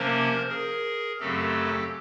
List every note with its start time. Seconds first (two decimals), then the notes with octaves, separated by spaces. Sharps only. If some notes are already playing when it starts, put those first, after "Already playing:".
Already playing: C3 F3 A#3 C#4 A#4 C5
0.49 G#4 A#4
1.20 F#2 C#3 F#3 A3 C4 G4 A4